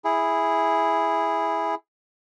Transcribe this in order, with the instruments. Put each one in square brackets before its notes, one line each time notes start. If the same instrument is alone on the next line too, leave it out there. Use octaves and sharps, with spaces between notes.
[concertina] E4 G#4